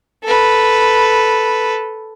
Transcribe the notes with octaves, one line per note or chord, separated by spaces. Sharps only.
A4 B4